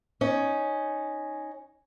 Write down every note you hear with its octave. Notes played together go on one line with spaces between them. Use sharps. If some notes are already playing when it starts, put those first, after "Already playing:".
C#4 D#4